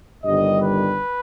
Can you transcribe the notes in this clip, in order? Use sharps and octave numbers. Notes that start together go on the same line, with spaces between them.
G1 G2 D#3 G3 D#5
B4